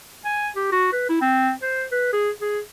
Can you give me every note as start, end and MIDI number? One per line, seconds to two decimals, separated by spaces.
0.25 0.49 80
0.56 0.69 67
0.72 0.89 66
0.92 1.06 71
1.09 1.16 64
1.21 1.51 60
1.62 1.84 72
1.92 2.09 71
2.13 2.30 68
2.41 2.59 68